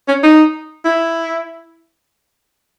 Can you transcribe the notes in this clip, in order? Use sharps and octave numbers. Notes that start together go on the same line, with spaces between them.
C#4
D#4
E4